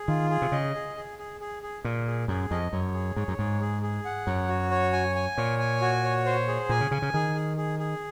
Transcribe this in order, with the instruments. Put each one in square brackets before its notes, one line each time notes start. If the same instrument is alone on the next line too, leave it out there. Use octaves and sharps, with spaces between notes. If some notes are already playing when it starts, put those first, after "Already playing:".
Already playing: [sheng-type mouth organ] G#4
[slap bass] D#3 [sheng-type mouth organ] F4
[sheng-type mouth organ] G#4
[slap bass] C3
[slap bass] C#3 [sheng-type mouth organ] D#5
[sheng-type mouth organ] G#4
G#4
G#4
G#4
G#4
[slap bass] A#2 [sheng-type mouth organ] G#4
[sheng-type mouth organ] G#4
[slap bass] F#2 [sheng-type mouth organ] G#4
[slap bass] F2 [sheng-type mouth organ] D#5
[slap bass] F#2 [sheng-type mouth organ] C#5
[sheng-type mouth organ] G#4
[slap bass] G#2 [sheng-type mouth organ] C#5
[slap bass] F#2
[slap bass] G#2 [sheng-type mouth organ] G#4
[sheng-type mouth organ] G#4
G#4
F#5
[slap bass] F#2 [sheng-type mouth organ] C#5
[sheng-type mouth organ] F#4
C#5
G#5
G#5
[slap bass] A#2 [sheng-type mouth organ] C#5
[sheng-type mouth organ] G#5
F#4
C#5
C5
G#4
[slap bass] A#2 [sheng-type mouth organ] G#5
[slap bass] C#3
[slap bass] C#3 [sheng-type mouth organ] G#5
[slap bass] C#3
[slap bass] D#3 [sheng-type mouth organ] G#4
[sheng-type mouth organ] G#4
G#4
G#4